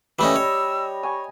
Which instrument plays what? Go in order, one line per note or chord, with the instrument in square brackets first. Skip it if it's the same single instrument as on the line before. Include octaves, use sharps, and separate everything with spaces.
[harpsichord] E3 A3 C#4 [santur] G3 D#5 [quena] E6
[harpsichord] C#5
[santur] G#5 [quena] C#6